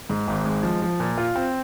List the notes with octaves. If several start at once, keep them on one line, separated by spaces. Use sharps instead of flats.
G#2
G#1
G#3
F3
F3
A#2
F4
C4